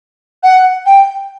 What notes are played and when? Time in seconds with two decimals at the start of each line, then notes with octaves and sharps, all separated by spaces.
0.43 F#5
0.86 G5